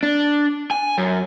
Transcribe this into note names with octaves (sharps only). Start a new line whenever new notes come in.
D4
G#5
F#2